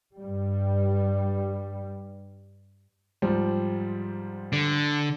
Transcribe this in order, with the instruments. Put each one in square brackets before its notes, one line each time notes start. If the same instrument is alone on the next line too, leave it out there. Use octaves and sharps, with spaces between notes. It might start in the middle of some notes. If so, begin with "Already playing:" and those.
[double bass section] G2 G3
[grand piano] G#2 F3 G3
[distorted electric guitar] D3